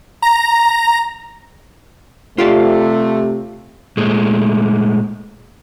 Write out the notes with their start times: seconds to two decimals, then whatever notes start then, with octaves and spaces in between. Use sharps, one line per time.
0.22 A#5
2.38 C3 A3 F4 G4 D5
3.97 A#2 G#3 A3